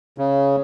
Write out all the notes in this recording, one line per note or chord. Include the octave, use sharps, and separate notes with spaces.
C#3